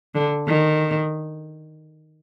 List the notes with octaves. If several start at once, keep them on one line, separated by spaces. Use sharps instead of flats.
D3
D#3